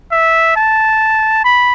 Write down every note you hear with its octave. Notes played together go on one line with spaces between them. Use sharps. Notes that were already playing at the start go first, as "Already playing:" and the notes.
E5
A5
B5